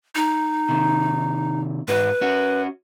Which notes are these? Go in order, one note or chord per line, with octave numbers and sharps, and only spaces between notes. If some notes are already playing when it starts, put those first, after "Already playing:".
D#4
C3 D#3
G#2 F#4 B4
C#4 F#4